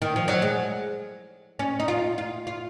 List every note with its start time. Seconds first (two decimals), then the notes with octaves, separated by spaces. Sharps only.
0.02 D#3
0.16 F3
0.28 F#3
0.42 G#3
1.59 C#4
1.80 D#4
1.88 F4
2.18 F4
2.47 F4